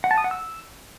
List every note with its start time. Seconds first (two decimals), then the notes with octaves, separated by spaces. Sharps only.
0.04 F#5
0.11 A5
0.18 D#6
0.24 F#5
0.31 E6